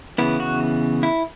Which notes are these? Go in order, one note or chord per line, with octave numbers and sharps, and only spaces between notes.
C#3 E3 B3 E4
F#4
E4